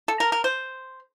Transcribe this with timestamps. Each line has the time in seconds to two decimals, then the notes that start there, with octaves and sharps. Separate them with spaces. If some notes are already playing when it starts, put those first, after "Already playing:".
0.08 A4
0.20 A#4
0.32 A#4
0.44 C5